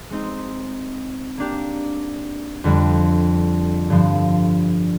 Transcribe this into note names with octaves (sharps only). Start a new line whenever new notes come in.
G#3 C4 D#4
A#3 D4 G4
F2 D3 G3
G2 D3 F3